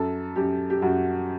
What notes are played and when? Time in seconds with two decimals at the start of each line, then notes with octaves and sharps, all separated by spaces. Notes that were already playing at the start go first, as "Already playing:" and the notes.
Already playing: F#2 A4
0.36 F#2 G4
0.70 G4
0.82 F#2 F#4